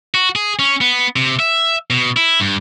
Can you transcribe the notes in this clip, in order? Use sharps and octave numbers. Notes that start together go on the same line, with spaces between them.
F#4
G#4
C#4
B3
C3
E5
B2
E4
G2